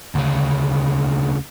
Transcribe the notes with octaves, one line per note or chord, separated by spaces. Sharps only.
D2 C#3